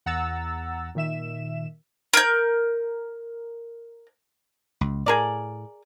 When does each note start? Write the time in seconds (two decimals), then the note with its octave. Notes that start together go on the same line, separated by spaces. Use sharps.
0.06 E2 F#5 A#5 E6 A6
0.95 A#2 D#3 E5 E7
2.13 A#4 G6
4.81 C#2
5.06 A2 G#4 A#4 D5